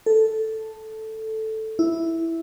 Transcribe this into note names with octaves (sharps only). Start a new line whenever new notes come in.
A4
E4